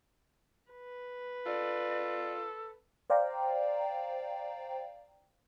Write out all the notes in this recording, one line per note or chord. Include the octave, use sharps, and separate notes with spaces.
B4
F4 A4 D5
C5 D5 F5 G5 A#5